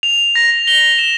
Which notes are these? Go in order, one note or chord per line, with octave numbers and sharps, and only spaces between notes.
F7
A#6
G7
E7